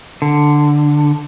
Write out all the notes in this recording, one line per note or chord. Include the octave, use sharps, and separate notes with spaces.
D3